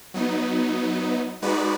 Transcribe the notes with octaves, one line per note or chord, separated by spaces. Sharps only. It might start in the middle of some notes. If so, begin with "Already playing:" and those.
F#3 B3 D#4
G#3 D#4 F#4 B4 D5